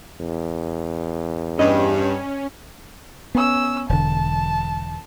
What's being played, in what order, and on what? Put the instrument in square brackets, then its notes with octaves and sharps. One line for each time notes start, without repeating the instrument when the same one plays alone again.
[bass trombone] E2
[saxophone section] G2 [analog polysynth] C#4 [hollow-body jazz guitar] D#5
[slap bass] B3 [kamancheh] C#4 E6
[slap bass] E1 D3 [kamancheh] A5